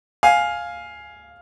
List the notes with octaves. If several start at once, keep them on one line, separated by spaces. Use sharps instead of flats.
F5 G#5